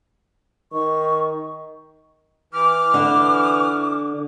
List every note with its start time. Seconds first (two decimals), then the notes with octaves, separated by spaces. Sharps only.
0.73 D#3 C#6
2.53 E3 D6 F6
2.94 D3